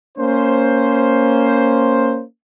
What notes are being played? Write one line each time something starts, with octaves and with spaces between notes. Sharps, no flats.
A#3 C#4 C5